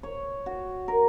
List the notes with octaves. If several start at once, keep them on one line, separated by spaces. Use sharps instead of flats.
C#5
F#4
A#4